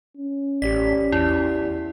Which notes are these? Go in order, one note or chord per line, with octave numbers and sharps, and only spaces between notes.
C#4
A1 G4 D5 B6
E2 E4